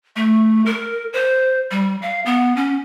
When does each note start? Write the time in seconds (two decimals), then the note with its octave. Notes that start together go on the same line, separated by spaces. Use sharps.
0.16 A3
0.66 A#4
1.13 C5
1.71 G3
2.02 F5
2.26 B3
2.56 C#4